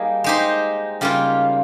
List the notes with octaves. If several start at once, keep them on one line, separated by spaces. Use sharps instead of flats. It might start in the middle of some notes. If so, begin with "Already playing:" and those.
Already playing: G3 A#3 D#4 G#4
G#3 D#4 G4 C5
C#3 G3 A#3 F4